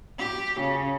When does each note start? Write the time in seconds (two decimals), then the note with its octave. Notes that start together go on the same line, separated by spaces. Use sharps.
0.19 G4
0.60 C#3